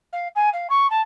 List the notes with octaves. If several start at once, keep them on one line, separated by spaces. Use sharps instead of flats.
F5
G#5
F5
C#6
A5